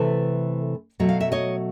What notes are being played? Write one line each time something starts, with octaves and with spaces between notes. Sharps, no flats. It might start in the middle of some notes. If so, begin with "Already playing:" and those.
Already playing: C3 E3 A3 A4 B4
B2 F#3 A3
F5
E5
C#5 D#5